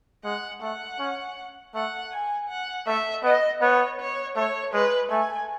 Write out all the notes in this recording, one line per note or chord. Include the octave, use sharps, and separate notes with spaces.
G#3 F#5
A3 F#5
C#4
A3 F#5
G#5
F#5
A3 E5
B3 D#5
B3 C#5
C#5
A3 C#5
G#3 B4
A3 G#5